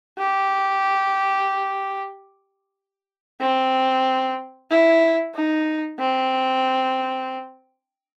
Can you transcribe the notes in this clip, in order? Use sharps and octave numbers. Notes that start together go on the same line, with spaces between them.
G4
C4
E4
D#4
C4